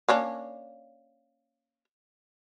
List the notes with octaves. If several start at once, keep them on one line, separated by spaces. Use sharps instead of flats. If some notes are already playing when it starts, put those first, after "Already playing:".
A#3 C#4 D4